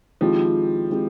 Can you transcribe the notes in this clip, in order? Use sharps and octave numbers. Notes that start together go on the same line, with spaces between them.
D#3 F3 G#3 C4 E4 G4
D#3 G#3 C4 E4 G4